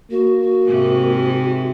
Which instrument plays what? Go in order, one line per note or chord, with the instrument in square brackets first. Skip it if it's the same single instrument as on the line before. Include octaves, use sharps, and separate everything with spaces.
[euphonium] A#3 [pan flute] F#4
[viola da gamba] G#2 C3